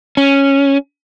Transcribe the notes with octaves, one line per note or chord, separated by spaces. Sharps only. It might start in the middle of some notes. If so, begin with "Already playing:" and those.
C#4